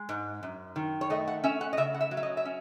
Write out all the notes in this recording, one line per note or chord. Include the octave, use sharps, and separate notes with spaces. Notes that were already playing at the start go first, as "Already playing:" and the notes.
Already playing: G#3
G#2
F#2
D#3
C#5
A3 D#5
F#5
C#4 E5
F#5
D#5
C#3 E5
F#5
E5
F#3
E5
D#5
E5
C#4